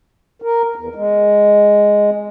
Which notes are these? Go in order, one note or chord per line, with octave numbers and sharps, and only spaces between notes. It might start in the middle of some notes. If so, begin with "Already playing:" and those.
A#4
E2
G#3